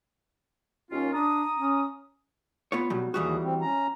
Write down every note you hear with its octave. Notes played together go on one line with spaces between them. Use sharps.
D#2 C#4 F4
D4 A#5 D#6
C#4
B3 F4 C#5
B2 F#3 G3
D#2 E3 G3 F#4 G#4
C4
C#4 A#5